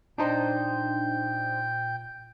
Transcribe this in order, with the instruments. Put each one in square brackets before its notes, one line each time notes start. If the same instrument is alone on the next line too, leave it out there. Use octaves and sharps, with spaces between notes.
[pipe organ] A#2 G5 G6 [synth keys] D4 D#4 C5